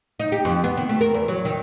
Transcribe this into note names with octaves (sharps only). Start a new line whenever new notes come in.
D#4
G4
F2
B3
D#3
A3
A#4
E2
F#3
D#3